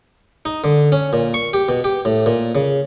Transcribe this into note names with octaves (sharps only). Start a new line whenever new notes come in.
D#4
D3
C#4
A#2
C#6
G4
B2
G4
A2
A#2
C#3